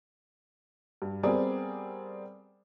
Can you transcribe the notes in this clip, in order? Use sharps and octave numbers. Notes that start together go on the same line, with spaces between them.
G2
G3 B3 C4 G#4 A#4 D5